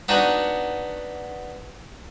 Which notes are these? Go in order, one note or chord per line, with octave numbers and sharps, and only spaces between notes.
B3 D4 D#4 F#4 F#5 G#5